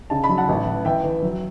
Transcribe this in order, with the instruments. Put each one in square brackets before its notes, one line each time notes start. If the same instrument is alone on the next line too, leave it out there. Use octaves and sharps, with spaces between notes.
[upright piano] C#3 A5
B5
F#3
F#5 A5
A1
E3
E3 E5 G5
E3
F#3